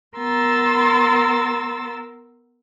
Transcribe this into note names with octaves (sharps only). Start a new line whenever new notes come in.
B3 A#4 C6 E6 A6